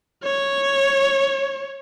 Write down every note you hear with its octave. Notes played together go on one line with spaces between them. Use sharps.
C#5